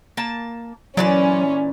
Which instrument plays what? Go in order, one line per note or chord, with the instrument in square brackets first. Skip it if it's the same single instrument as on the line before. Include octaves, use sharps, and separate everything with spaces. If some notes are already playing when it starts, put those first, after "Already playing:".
[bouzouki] A#3 A5
[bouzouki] A#2 E3 D5 [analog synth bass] F#3 [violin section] C#4